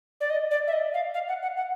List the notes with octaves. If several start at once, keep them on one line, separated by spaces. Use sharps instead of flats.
D5
D#5
D5
E5
D#5
F5
F5
F#5
F#5
F#5